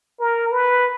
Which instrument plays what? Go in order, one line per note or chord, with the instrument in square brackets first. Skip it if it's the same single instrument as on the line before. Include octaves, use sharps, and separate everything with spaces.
[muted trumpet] A#4
B4